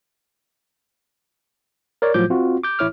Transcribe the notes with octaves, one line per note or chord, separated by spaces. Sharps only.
A#4 C#5 D5
A2 F3 F#3 F4 D6 G6
C4 F4 F#4
D6 G6
A1 E4 C#5 D6 F6